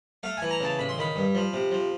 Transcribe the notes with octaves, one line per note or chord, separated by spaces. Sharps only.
A3 F5
E3 G#5
A#5
C#3 A5
A1 B5
C6
D#3 B5
G2
F3
C3
F3